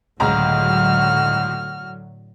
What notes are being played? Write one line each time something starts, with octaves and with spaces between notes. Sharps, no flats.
C#2 A2 D3 F#3 F#4 A#5 F6